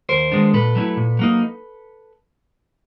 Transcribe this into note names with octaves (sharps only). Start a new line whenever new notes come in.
D#2 A#4 C5
D#3 G#3 B3 D4
A#2 A4 B4
F#3 A3 C#4 E4
A#2
F#3 A#3 D#4